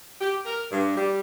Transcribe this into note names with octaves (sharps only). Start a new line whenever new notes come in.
G4
A#4
G2
G3